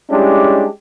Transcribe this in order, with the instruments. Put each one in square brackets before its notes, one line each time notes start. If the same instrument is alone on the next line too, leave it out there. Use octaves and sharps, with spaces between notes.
[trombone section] G3 G#3 C#4 D4 E4 G4